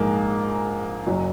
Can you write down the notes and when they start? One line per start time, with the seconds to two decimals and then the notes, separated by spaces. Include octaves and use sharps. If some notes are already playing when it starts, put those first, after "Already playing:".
Already playing: A#1 G#2 G#3 A#3
1.06 F#1 F#2 F#3